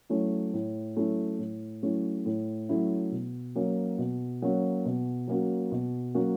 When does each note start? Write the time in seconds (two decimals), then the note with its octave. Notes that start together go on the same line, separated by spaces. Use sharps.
0.09 F#3 A3 C#4 E4
0.54 A2
0.97 F#3 A3 C#4 E4
1.39 A2
1.83 F#3 A3 C#4 E4
2.26 A2
2.69 F#3 A3 C#4 E4
3.12 B2
3.55 F#3 A#3 C#4 F#4
3.98 B2
4.42 F#3 A#3 C#4 F#4
4.86 B2
5.28 F#3 A#3 C#4 F#4
5.72 B2
6.15 F#3 A#3 C#4 F#4